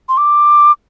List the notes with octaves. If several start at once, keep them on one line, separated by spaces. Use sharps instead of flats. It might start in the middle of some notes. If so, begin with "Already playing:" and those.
C6
D6